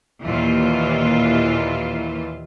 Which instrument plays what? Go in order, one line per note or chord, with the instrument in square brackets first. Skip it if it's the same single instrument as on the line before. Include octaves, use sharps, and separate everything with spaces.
[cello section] D#2 A#2 E3 F4